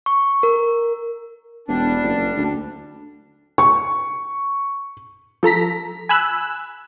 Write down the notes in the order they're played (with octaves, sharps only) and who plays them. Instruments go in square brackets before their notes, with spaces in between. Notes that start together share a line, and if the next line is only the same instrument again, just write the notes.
[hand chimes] C#6
A#4
[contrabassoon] E1 [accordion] G3 D4
[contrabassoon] F#1
D2
[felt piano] C#6
[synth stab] F3 A4 A#5 B6
G#5 B5 E6 F#6